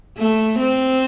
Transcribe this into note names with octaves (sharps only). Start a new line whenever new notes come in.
A3
C4